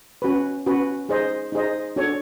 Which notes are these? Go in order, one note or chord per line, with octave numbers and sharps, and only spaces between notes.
C#4 F#4 B4
C#4 F#4 B4
D#4 G#4 C5 D#5
D#4 G#4 C5 D#5
D4 F#4 A4 C#5